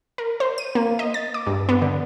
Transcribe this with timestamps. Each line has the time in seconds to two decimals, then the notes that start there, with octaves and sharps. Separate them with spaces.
0.18 A#4
0.40 C5
0.58 D#7
0.75 A#3
0.99 D#5
1.14 A6
1.34 D6
1.47 G2
1.69 B3
1.82 D3